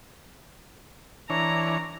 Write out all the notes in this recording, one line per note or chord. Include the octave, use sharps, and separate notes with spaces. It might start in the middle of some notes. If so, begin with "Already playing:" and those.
E3 D4 C#5 A#5